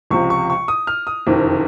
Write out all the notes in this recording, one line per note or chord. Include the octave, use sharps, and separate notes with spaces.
C#2 C3 F3 C#6
C#6
C#6
D#6
F6
D#6
F#1 F2 C3 D#3